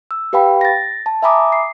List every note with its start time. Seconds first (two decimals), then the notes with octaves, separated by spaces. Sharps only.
0.11 E6
0.33 G4 B4 F5 G5 B5
0.61 A6 A#6
1.06 A5
1.22 E5 G#5 A#5 B5 D6 D#6
1.52 C7